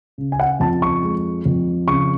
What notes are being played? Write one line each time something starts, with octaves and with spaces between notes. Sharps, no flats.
C#3
G#5
F#5
F2 A5
C#6
G#3
F2
C#3 C#6